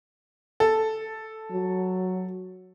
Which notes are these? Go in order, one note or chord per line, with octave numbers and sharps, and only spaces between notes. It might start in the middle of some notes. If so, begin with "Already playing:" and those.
A4
F#3